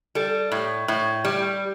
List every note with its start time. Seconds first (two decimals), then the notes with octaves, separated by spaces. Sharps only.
0.15 G3 A4
0.52 A2
0.88 A2
1.25 G3